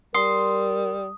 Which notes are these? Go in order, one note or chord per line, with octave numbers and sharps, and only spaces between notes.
G3 A#4 C6 D#6